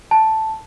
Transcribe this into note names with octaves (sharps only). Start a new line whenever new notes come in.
A5